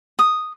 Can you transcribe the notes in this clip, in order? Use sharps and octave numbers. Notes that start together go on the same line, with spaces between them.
D#6